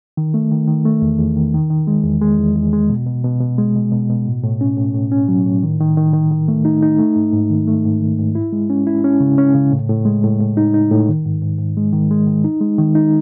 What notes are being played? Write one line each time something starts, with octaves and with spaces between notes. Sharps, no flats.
D#3
A3
D#3
D#3
A3
E2
E2
D#3
D#3
D#3
G#3
E2
G#3
E2
E2
G#3
B2
B2
B2
B2
G#3
B2
B2
B2
A2
A2
C#4
A2
A2
C#4
F#3
A2
D#3
D#3
D#3
D#3
D#3
A3
D#4
D#4
A3
G#2
G#2
D#3
A3
G#2
D#3
G#2
E4
G#3
C#4
E4
C#4
C#3
C#4
C#3
A2
A2
G#3
A2
A2
D#4
D#4
A2
D#3
G#2
G#2
G#2
G#3
D#3
G#3
D#3
D#4
G#3
D#3
D#4